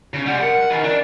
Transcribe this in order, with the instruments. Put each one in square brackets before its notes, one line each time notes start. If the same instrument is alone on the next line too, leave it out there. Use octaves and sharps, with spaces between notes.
[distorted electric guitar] C#3
[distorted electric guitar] G3 G#3 [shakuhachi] F#5
[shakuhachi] A#4 [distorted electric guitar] F#5
[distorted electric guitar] D#3 E3
D4